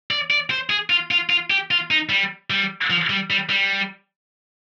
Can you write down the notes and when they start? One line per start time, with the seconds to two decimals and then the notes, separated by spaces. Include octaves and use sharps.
0.11 D5
0.31 D5
0.50 C5
0.70 G#4
0.90 F4
1.11 F4
1.30 F4
1.50 G4
1.71 F4
1.91 D#4
2.09 G3
2.50 G3
2.90 F3
3.10 G3
3.30 G3
3.50 G3